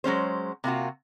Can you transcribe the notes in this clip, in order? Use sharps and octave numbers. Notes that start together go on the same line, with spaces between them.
F#3 G#3 C#4 C5
C3 A#3 F4 F#4